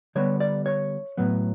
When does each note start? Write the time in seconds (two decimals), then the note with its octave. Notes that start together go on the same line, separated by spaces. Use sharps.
0.15 D3 G3 B3 C#5
0.40 D5
0.66 C#5
1.17 A2 F#3 B3